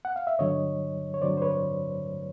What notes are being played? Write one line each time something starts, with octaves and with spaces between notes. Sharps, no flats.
F#5
F5
E5
G2 D3 F#3 C#5 D#5
C#5
G2 D3 F#3 C5 D5
C5
B4 C#5